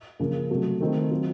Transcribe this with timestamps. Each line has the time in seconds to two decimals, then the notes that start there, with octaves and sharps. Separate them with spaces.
0.20 C#3 F3 A#3
0.51 C3 F#3 A3
0.81 D#3 A3 C4 F4
1.11 F#3 C4 F4